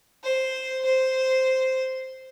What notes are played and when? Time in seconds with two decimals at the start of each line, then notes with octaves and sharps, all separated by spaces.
0.24 C5
0.85 C5